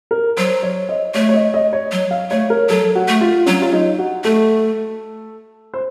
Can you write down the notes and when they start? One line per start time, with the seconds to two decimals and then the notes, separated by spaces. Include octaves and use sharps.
0.11 A#4
0.37 F#3 C5
0.63 C#5
0.89 D#5
1.14 A3 C#5
1.29 C#5
1.34 D#5
1.54 D#5
1.73 C#5
1.92 F#3
2.11 F5
2.31 A3 C#5
2.50 A#4
2.69 F#3 A4
2.95 F#4
3.08 A3
3.21 F4
3.46 F#3 C#4
3.62 F4
3.73 D#4
3.99 F#4
4.24 A3 A4
5.74 C5